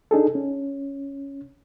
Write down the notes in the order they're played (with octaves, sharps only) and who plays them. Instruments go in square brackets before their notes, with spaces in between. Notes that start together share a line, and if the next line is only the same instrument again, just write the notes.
[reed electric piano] D4 D#4 G#4 A4
C#4